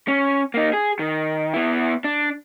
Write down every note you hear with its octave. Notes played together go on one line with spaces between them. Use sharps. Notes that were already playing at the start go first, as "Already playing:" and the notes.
C#4
A#3 D#4
G#4
D#3
B3 E4
D4